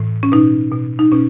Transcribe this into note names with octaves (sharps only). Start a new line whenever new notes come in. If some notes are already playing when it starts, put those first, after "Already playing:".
Already playing: A2 E3
C#4
B2 D#4
B2
D#4
B2 C#4